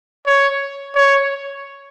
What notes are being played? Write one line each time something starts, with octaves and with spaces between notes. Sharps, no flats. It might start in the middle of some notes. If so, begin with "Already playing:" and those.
C#5
C#5